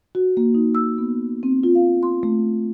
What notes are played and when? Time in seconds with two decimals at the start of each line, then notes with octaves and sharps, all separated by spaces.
0.15 F#4
0.37 A#3
0.55 D#4
0.75 E6
0.98 B3
1.43 C4
1.63 F4
1.75 F5
2.03 C6
2.23 A3